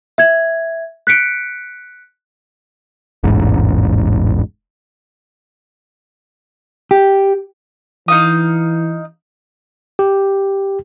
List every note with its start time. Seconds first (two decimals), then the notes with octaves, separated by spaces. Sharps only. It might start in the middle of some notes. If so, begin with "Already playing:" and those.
0.18 E5 G#6
1.07 F#6 B6 C#7 D7
3.23 E1 A1 G#2
6.91 G4
8.08 E3 D#4 F5 D#6
9.99 G4